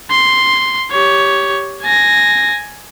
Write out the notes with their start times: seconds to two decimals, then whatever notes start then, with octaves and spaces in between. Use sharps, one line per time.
0.11 C6
0.92 G4 C#5
1.83 G#5 A#6